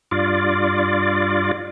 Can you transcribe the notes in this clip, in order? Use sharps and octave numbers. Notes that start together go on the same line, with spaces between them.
G2 F4 D5